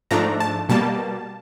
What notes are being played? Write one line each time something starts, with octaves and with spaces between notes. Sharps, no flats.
G#2 F3 A3 D4 A#5
A5
B2 G3 A#3 A5